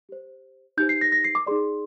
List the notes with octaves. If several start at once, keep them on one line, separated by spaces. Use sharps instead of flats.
G4 C5
D#4 G4 C5 G6
C7
A#6
A#6
C7
D6
D#4 G#4 D5 C6